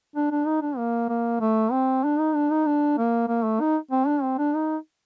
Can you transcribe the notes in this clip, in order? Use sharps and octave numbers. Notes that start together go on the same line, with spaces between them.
D4
D4
D#4
D4
A#3
A#3
A3
C4
D4
D#4
D4
D#4
D4
A#3
A#3
A3
D#4
C4
D4
C4
D4
D#4